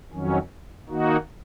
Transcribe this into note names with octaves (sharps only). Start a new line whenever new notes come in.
F2 D#3 F#3 C#4
D#3 A#3 D#4 F#4